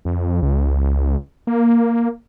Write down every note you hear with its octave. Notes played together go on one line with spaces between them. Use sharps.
F2
C#2
A#3